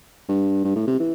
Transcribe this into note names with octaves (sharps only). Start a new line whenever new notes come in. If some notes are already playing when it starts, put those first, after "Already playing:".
G2
G2
A2
C3
E3